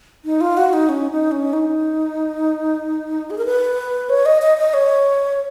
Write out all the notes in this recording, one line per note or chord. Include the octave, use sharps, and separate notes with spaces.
D#4
F4
F#4
D#4
C#4
D#4
C#4
D#4
G#4
A#4
B4
C#5
D#5
D#5
D#5
C#5